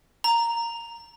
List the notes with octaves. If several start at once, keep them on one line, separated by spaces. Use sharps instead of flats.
A#5